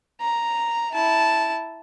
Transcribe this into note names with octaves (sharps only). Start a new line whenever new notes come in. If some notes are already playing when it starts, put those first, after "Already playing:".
A#5
E4 A5